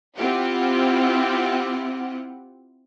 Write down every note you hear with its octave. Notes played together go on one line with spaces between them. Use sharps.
C4 E4 F4 G4 F#5